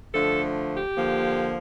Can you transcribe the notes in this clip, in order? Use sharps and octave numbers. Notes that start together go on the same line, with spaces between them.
D3 F3 A3 D4 A4
G4
D3 F3 A#3